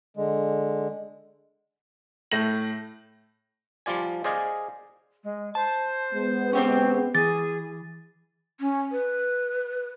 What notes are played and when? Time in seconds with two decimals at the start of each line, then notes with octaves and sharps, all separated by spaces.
0.17 D3 G#3
2.32 A2 A3 A#6 F#7
3.86 F3 G3 F4 D5 G#5
4.24 G#4 C5 D5 D#5 F5 G#5
5.24 G#3
5.55 C5 A5
6.13 G#3 B3
6.53 C4 C#4 G4 C5
7.15 E3 G#4 A6
8.60 C#4
8.92 B4